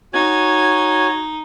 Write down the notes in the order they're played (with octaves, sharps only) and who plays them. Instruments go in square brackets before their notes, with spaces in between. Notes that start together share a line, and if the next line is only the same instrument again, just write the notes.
[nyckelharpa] D#4 [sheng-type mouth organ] F#4 C#5 G#5 [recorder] G#6